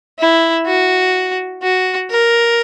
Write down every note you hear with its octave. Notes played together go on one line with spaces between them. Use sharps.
E4
F#4
F#4
A#4